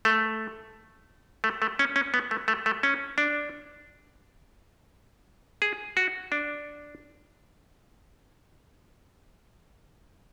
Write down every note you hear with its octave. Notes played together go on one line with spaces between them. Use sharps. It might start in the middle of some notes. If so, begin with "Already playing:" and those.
A3
A3
A3
C#4
C#4
B3
A3
A3
A3
C#4
D4
G#4
F#4
D4